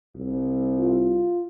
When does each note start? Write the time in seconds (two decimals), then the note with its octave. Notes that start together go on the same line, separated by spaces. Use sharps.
0.15 C2
0.77 F4